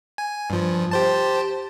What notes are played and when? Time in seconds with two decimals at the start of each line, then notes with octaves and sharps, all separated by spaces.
0.18 G#5
0.50 G2 F3
0.91 G4 C5 A5